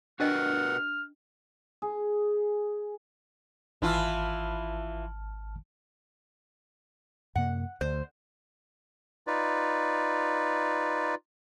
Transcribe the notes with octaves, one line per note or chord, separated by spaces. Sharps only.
D4 F#4 A#4 B4 D#5 F#5 G5 F6
G#4
G#1 E3 E4 F4 A5 F6
F#2 C3 A#3 F#5
D2 C5
D#4 F4 B4 D5